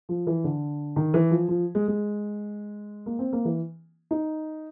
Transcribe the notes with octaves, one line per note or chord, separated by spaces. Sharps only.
F3
E3
D3
D#3
E3
F3
F3
G#3
G#3
A#3
C4
A#3
E3
D#4